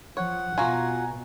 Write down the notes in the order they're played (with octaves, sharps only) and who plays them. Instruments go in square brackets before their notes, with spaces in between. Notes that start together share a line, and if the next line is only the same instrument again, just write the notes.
[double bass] F3 [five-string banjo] C#5 [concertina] F#5
[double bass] B2 [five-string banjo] F4 F#4 [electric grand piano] G#5 A#5